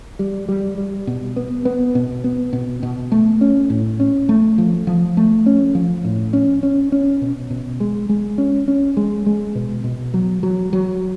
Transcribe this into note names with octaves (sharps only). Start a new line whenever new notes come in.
G3
G3
G3
B2
B3
B3
B2
B3
B2
B2
A3
C#4
A2
C#4
A3
F3
F3
A3
C#4
F3
A2
C#4
C#4
C#4
B2
B2
G#3
G#3
C#4
C#4
G#3
G#3
B2
B2
F#3
F#3
F#3